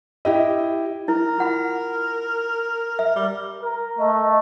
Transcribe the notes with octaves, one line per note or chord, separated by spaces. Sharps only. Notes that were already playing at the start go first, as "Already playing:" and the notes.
E4 G4 D#5
E4 A#4
F4 F#5 B5
E5
G3
A#4
A3 D#5